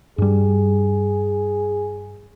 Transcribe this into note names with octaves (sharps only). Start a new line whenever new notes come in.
G2 G3 G#4